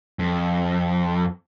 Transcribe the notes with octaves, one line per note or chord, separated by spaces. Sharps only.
F2